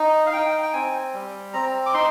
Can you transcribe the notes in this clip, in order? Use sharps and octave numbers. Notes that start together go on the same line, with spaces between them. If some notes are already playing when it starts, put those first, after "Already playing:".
Already playing: D#4
F5
D#4 G5
G5
C4 G#5
G3
C4 A#5
D6
D#4 C6